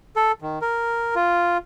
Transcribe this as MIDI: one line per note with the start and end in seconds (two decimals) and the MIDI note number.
0.16 0.32 69
0.42 0.59 51
0.61 1.15 70
1.16 1.57 65